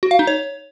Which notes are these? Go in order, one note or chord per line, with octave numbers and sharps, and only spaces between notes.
F#4
F5
D#4
C#5